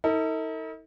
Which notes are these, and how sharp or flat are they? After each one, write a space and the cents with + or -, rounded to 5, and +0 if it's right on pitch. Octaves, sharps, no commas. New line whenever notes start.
D#4 +45 A4 +45